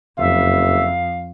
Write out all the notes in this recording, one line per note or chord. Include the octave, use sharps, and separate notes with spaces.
F#1 F2 E5 F5